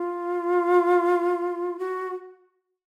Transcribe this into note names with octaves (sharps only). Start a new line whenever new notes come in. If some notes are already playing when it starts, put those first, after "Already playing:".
Already playing: F4
F#4